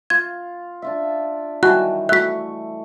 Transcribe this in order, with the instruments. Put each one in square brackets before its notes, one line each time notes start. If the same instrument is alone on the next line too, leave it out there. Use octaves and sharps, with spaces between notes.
[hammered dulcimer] F4 [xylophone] G#6
[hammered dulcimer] D4 F4 E5
[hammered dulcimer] D#3 E3 G3 [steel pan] F#4 G#5 A5 [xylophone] F#6
[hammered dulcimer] A3 C#6 [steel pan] F#4 E5 [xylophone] F#6 B6